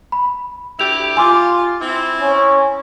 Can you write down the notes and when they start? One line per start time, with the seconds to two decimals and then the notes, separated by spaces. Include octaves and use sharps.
0.12 B5
0.79 D2 E4 G4 F7
1.17 F4 G#5 C6 D6
1.80 C4 E4
2.21 C#4